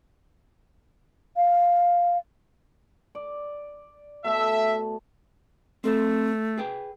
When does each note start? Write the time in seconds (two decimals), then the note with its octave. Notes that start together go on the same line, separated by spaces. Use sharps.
1.36 F5
3.15 D5
4.24 B2 A3 E5
5.84 A3 C4 A4 C5
6.58 G#4 B4 G5